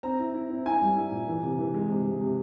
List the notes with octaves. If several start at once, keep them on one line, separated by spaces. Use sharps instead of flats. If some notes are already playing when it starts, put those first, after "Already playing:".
C4 A#5
E4
E4
C4
E4 G#5
G3
E4
A#2
E3
C3
E3
G#3
C3
G#3
C3